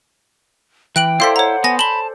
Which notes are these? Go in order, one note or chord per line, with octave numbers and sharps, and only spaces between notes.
E3 G5 F#6 D7 F#7
E4 A4 C5 D5 F5 C6 B6
C#5 F#5 A#5
B3 G#5 A#6
A5 B5 F#7 G7